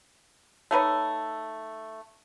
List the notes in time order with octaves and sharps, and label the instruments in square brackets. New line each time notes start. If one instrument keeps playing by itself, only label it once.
[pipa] A3 D#4 B4 C#5